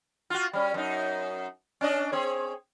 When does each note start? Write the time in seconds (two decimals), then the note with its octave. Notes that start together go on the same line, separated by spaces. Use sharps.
0.30 F4 F#4
0.53 G3 C#4
0.74 F#2 D#4
1.81 C#4 D4 D#5
2.12 C4 G#4 C#5